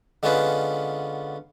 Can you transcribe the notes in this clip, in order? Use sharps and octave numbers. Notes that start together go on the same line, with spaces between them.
D3 G#3 B3 C#4 F4 B4